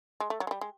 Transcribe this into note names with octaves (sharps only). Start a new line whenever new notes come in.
G#3
A3
F#3
G#3
G3
G#3